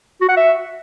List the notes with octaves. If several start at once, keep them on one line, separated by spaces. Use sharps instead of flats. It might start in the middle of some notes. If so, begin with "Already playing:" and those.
F#4
F#5
E5